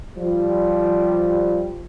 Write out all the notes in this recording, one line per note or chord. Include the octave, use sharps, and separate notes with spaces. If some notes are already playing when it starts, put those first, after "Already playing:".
F3 G3